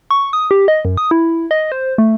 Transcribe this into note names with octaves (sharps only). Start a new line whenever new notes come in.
C#6
D#6
G4
D#5
F#2
D#6
E4
D#5
C5
A3